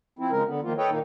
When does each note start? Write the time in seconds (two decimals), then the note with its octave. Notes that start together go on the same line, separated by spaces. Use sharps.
0.19 F3 C4 E4
0.31 C#3 F3 G#3 A#4
0.46 D3 B3
0.63 D#3 F3 A#3 F4
0.78 A4 B4 C#5 D#5 G5
0.90 A#2 D#3 A#3 D#4